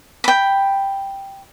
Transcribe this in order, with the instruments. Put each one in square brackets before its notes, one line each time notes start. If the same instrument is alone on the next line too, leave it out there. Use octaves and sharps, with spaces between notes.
[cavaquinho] G5 B5